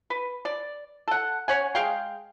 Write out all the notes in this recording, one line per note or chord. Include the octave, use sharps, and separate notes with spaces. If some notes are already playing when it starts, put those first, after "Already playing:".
B4
D5
A4 F#5
C#4 C#5 F#5 G#5
G#3 G#4 F5 G5